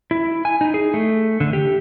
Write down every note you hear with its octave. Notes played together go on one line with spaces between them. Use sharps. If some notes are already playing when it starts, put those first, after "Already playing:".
E4
G#5
D#4
G#4
A3
D3
G4